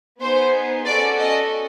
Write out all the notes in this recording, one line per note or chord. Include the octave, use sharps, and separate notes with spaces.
B3 D#4 G#4 C5
C#4 F#4 A4 D5
D#5